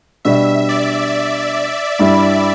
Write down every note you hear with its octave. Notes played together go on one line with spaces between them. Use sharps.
B2 G3 D4 E5
D5
G2 G3 E4